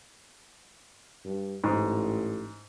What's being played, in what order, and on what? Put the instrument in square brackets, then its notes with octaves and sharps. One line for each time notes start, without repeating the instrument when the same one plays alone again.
[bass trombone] G2
[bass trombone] A1 [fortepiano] G#2